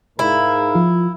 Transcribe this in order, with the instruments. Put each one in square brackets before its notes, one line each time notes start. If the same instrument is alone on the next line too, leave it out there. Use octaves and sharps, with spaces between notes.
[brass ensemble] G#2 A#4 F5 [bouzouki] E4
[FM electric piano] F3 F4